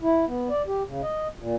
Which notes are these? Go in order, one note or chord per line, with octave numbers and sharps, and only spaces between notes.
E4
B3
D5
G4
C#3
D#5
A#2